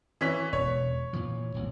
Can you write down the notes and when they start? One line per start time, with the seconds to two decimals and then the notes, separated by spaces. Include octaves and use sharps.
0.21 E3 C#4 B6
0.53 E1 C#5
1.13 A#2 E3 F3
1.54 D#1 C2